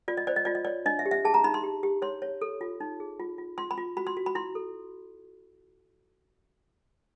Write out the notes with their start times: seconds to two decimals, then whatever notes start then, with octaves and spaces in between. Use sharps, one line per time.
0.08 F4 D5
0.17 D#5
0.27 C5 D5
0.36 D#5
0.45 F4 D5
0.55 D#5
0.65 C#5 D5
0.86 D4 D#5
0.99 E5
1.06 G4
1.11 E5
1.25 G#4 A5
1.34 A#5
1.44 D#4 B5
1.54 C6
1.63 G4
1.83 G4
2.02 C#5 C6
2.22 C#5
2.42 A4
2.61 F4
2.80 D#4
3.00 G#4
3.20 F4
3.38 F4
3.58 F4 C6
3.71 B5
3.77 F4
3.97 F#4 B5
4.07 C6
4.17 F#4
4.26 B5
4.35 E4 C6
4.55 A4